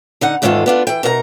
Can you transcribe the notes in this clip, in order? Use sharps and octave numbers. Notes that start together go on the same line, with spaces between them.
D3 D#4 F#5
E2 G#2 D#3 G#3 F4 A4
B3 D4 F4
E3 G5
B2 D#4 A#4 E5 A#5